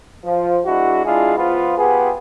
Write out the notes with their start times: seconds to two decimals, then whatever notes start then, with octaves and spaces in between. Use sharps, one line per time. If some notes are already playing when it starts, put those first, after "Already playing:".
0.24 F3
0.66 G#3 D4 E4 F#4
1.05 G#3 D4 E4 F4 G#4
1.37 F3 B3 F4
1.77 B3 F4 G4 G#4